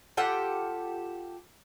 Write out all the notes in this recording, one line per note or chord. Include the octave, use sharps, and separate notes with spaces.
F4 G4 A4 F#5